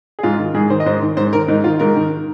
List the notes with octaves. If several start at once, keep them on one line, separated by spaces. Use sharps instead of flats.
G#4
G#2 F4
D#3
G#2 G#4
D#3 C5
D#5
G#2 C5
D#3
G#2 C5
D#3 A#4
G#2 D#4
D#3 F4
G#2 A#4
D#3